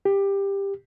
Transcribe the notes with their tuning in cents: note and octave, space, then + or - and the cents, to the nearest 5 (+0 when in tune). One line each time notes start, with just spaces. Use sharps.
G4 +15